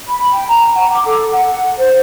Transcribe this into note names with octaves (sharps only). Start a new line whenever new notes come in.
B5
G5
A#5
F#5
D6
A4
F#5
C5